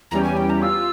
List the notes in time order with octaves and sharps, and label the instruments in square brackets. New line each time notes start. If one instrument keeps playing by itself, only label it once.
[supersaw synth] E2 E3 G3 C#4 G4 [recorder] A#5
[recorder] G#5
G5
A#5
[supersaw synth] F4 [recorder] E6